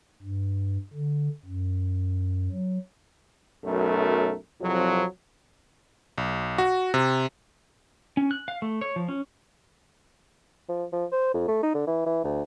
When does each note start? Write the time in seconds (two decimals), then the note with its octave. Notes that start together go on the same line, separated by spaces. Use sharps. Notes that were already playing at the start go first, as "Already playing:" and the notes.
0.22 G2
0.93 D3
1.45 F#2
2.51 F#3
3.64 B1 F#2 F#3 A3 A#4
4.61 C2 F2 F3 F#3
6.18 B1
6.58 F#4
6.94 C3
8.17 C#4
8.31 F#6
8.48 F5
8.62 A3
8.81 C#5
8.96 F3
9.08 C#4
10.69 F3
10.93 F3
11.12 C5
11.34 F2
11.48 A3
11.63 D#4
11.74 D3
11.87 E3
12.06 E3
12.24 D2